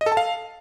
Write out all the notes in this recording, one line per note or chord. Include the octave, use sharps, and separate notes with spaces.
D#5
A4
A5
F5